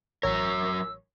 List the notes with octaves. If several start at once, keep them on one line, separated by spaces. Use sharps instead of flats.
A1 F#3 A#4 C#5 E6